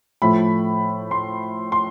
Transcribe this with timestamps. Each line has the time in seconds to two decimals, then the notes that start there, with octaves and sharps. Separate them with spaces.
0.22 A2 F3 A3 B5
1.11 C6
1.72 C6